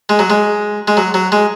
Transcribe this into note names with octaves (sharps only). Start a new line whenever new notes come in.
G#3
F#3
G#3
G#3
F#3
F#3
G#3